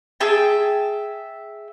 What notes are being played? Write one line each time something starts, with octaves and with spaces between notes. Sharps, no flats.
G#4 E5 G5 A5